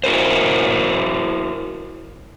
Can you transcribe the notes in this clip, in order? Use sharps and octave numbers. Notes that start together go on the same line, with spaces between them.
E4 F#4 A#4 C5